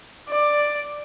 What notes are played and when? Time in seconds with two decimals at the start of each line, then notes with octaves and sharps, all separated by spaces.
0.29 D5